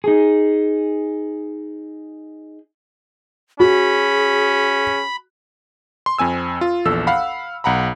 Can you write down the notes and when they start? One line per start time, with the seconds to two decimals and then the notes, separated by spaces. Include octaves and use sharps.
0.04 D#4 G#4
3.60 C#4 F#4 G#4 B5
6.06 C6
6.18 F2 C4 G#5 E6
6.61 F4
6.85 A#1 E2 A4 E6
7.07 F5 F#5 B5
7.64 B1 F#5 A#5 B5